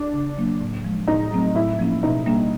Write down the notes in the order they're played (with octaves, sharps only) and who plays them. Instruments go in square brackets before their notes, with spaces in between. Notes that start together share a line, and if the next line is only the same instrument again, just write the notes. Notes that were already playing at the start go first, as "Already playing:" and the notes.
Already playing: [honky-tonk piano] D4
[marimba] C#3
F#3 A#3
A2
F3 G#3
[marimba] A2 [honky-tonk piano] D#4
[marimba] F#3 A3 C4
[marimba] A2 [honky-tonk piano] E4
[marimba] F3 A#3 C#4
[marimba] B2 [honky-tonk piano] D#4
[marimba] G3 A#3 D4